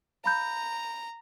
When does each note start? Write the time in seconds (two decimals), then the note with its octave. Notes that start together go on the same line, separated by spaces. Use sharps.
0.24 F5 A#5 B5 G6